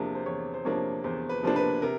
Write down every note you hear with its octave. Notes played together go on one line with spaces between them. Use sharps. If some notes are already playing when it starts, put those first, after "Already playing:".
Already playing: E2 C3 F3 A#3 D4
C5
E2 C#5
C5
C3 F3 A#3 D4 C#5
E2 C5
B4
C3 F3 A#3 D4 C5
B4
C3 A#4